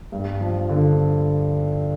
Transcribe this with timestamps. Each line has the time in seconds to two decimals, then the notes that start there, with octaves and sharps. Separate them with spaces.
0.12 G2
0.41 F3
0.69 D3